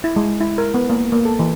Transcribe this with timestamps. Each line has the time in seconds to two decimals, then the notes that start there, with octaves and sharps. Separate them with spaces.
0.04 E4
0.16 G#3
0.41 E4
0.58 A#4
0.74 B3
0.90 A#3
1.12 A#3
1.25 A4
1.39 E3